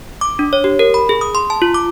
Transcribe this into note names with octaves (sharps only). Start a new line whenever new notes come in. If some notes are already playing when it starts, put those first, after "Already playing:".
D6
D4
C#5
G4
A#4
B5
G#4
D#6
C6
A5
F4
D6